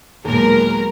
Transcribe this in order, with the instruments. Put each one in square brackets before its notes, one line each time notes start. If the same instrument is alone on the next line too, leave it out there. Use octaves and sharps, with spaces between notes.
[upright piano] D#2 A#2 [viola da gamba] F#3 G#3 B3 [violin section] A#4